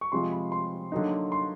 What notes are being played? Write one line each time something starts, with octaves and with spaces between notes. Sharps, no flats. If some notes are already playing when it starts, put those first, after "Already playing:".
C#6
C3 F3 G#3 C6
B5
C6
D3 F#3 A#3 D#4
C6